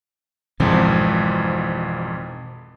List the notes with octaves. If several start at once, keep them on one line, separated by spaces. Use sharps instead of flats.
G#1 F2 G#2 B2 E3 C4